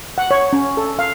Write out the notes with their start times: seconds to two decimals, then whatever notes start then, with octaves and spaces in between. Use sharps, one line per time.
0.18 F#5
0.31 C#5
0.53 C#4
0.77 A4
0.99 F5